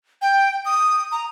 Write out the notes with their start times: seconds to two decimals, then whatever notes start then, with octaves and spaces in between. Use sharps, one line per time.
0.22 G5
0.65 D#6
1.12 A#5